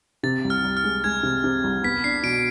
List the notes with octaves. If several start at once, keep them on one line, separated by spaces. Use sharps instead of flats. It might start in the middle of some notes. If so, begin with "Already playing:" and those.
C3 A6
C2
F6
C2
F6
G#3
G#3 G#6
C3
C3
C2
B3 B6
D4 C7
B2 D7